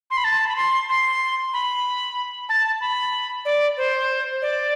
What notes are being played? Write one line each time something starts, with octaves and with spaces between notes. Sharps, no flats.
C6
B5
A5
B5
C6
C6
B5
A5
B5
D5
C5
D5